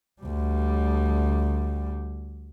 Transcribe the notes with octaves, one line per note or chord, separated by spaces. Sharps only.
D2 G3